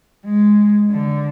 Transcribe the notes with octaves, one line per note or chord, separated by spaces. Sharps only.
G#3
D3